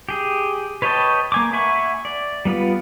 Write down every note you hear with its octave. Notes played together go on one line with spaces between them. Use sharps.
G4 G#4
B4 C#5 D#5 G5 A5
A#3 G#5 D6
E5 F#5 G#5 B5 C#6
D5
G3 B3 F4 B4